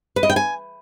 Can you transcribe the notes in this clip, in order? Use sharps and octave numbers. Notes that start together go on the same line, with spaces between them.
B4
D#5
G5
G#5